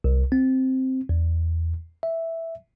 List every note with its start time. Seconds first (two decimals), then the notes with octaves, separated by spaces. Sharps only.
0.04 C2
0.32 C4
1.09 E2
2.03 E5